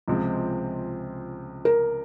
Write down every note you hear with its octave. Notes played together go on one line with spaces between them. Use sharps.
C#2 C3 F3 G#3 C4
A#4